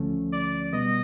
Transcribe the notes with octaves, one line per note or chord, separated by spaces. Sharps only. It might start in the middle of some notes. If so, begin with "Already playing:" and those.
Already playing: D2 D3 F3 A3 C#4
D5
B2 G3 B3 D#5